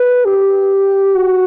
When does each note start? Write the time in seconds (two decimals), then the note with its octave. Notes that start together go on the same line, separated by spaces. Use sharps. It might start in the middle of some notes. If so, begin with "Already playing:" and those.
Already playing: B4
0.25 G4
1.15 F#4